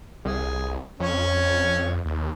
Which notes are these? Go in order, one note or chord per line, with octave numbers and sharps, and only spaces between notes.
C2 G#4
F2 C#4 C#5
D#2